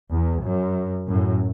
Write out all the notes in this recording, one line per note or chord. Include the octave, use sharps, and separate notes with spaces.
E2
F#2
F#2 A2